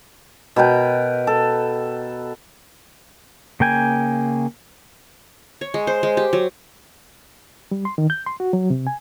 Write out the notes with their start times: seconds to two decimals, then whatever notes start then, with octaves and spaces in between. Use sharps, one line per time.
0.56 B2 A#4 B4 G5
1.27 A4
3.60 C#3 A#3 G5 G#5
5.61 C#5
5.74 G#3
5.87 C5
6.03 G#3
6.17 G4
6.33 F#3
7.71 G3
7.85 C6
7.98 D#3
8.10 G6
8.26 C6
8.40 F#4
8.53 F#3
8.70 C3
8.87 G#5